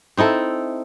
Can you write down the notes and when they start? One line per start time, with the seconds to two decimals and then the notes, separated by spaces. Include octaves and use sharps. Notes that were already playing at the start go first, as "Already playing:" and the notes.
0.17 C4 D#4 E4 A4